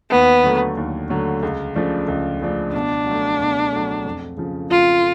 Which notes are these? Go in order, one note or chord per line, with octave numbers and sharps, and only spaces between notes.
D#2 B3
D3 F#3 A3
D#2
D3 F#3 A3
C#2
C#3 F3 A3 D4
C#2
C#3 F3 A3 D4
B2 D4
F#3 A3
B2
F#3 A3
F2
C#3 F3
F2 F4